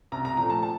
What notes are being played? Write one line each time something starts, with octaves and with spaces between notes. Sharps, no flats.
C2 A#5
A#5
A#2 F3 A3 A#5
A5
A5